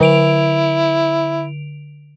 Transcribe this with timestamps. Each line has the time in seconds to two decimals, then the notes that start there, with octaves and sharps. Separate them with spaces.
0.01 D3 E4 D7 F7